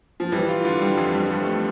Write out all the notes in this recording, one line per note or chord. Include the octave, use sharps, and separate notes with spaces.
F3
E3 G3
F4
D3 F4
G3
F2 E3
G3
F3
G3
A3
A3